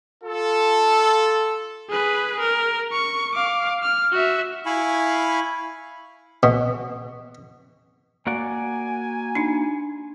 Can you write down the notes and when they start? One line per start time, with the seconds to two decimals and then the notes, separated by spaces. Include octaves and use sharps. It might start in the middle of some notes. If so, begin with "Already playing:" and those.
0.24 F4 A4
1.90 G#4 B4
2.40 A#4
2.92 C#6
3.35 F5 D6
3.83 F6
4.12 F#4 E5
4.66 E4 F5 G#5 B5 C#6
6.43 B2
8.27 A#3 F#4 D5 G#5
9.35 D4 D#4